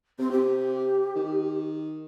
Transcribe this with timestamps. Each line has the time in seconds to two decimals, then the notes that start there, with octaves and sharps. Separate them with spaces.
0.19 C3 C4
0.32 G4
1.16 D#3